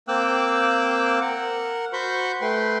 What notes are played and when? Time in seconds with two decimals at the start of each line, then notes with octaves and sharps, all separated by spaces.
0.08 A#3 C4 G5 D6 E6 F#6
1.21 A#4 F#5
1.93 F#4 C5 B5 C#6 G6
2.41 A3 B4 G5 C6